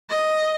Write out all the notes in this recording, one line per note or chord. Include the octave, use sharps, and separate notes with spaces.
D#5